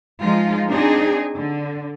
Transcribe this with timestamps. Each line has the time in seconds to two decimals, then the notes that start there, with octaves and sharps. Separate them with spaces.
0.20 F3 G#3 D#4 F4
0.68 C4 D4 D#4 G#4
1.34 D3